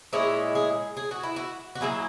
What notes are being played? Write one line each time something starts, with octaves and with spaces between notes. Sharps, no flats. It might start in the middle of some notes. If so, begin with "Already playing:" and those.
A#2 G#3 C#4 E4 G#4
G#4
G#4
F#4
E4
F#4
F#4
F#3 A#3 E4 G#4